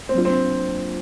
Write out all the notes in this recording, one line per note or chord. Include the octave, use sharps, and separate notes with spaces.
C4
F#3 A#3 D4 F4
C4